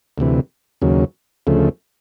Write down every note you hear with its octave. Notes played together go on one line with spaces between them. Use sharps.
D2 C3 E3
D#2 C#3 F#3
D2 C#3 F3 A3